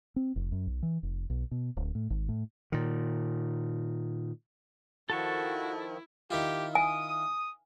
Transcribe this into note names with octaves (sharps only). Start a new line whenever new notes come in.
C4
F1
F#2
B1
E3
F1
B1
B2
D1
A2
G#1
A2
A#2 D#3
D#3 F3 E4 F#4 A4 A5 C#6
D#3 E4 F4 G4
G#5 D#6